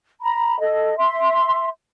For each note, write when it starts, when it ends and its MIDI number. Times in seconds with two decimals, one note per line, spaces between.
0.22 0.60 82
0.22 0.60 83
0.61 0.94 69
0.61 0.94 75
0.98 1.67 76
0.98 1.67 84